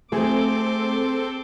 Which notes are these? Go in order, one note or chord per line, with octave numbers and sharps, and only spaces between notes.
A3 C4 G#4 A4 C6 D6